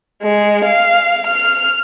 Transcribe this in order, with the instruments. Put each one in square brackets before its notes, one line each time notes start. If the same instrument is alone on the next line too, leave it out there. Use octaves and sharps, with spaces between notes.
[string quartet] G#3
F5
F6